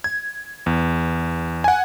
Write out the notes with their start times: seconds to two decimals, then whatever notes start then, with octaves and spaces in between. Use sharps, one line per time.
0.04 G#6
0.66 E2
1.64 F#5 G#5